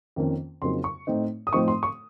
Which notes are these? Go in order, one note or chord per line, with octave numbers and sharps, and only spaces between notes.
F2 D#3 A#3 C#4
F2 C#3 F#3 A#3 D#4 C6
C#6
A2 A3 C4 D#4
D#6
A2 F3 C4 D#4 C#6
C6
C#6